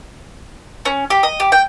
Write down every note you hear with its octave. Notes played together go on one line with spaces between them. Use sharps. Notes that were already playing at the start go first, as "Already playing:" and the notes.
C#4
G4
D#5
G4
G5